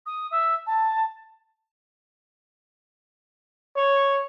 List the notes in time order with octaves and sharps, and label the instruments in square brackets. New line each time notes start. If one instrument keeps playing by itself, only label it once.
[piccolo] D#6
E5
A5
[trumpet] C#5